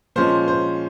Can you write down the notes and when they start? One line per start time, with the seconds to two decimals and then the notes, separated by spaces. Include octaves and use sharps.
0.16 A#2 F3 G#3 C#4 C5
0.48 C5